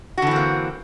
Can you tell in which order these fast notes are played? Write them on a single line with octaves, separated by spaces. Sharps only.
F#4 D3 E3 C4 A#3